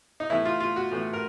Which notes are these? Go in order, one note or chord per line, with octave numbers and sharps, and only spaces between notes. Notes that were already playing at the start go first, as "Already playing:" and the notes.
D#4
A2 E3 A3 E4
F4
F4
F#4
A2 E3 A3
A#4